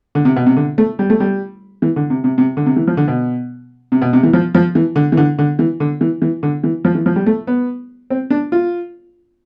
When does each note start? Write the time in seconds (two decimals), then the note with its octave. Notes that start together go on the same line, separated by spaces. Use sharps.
0.15 D3
0.25 C3
0.36 B2
0.46 C3
0.56 D3
0.78 A3
0.99 G3
1.10 A3
1.20 G3
1.82 E3
1.96 D3
2.10 C3
2.24 C3
2.38 C3
2.57 D3
2.66 C3
2.76 E3
2.87 F3
2.97 D3
3.08 B2
3.92 C3
4.02 B2
4.13 C3
4.23 E3
4.33 F3
4.55 F3
4.75 E3
4.96 D3
5.12 E3
5.17 D3
5.39 D3
5.59 E3
5.80 D3
6.01 E3
6.22 E3
6.43 D3
6.64 E3
6.85 F3
6.95 E3
7.06 F3
7.16 G3
7.26 A3
7.47 B3
8.10 C4
8.30 D4
8.52 F4